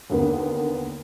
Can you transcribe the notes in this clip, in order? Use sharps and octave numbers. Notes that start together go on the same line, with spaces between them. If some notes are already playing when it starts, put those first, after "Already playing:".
D#2 D3 A#3 B3